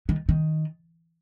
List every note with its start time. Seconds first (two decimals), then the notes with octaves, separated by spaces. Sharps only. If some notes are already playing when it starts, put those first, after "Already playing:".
0.09 D#3
0.29 D#3